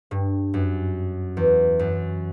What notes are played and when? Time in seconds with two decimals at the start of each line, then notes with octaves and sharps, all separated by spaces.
0.11 G2
0.54 F#2
1.37 E2
1.79 F#2